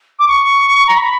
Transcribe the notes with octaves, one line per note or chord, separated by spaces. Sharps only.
D6
C#6
A#5
B5